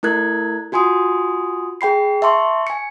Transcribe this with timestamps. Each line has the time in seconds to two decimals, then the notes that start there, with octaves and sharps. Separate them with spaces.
0.03 A3 E4 A#4 F#6 G#6
0.72 F4 F#4 G#5 C6 D#6
1.81 G#4 G5 B5 C7
2.22 E5 A5 C6 C#6
2.67 G#5 C#7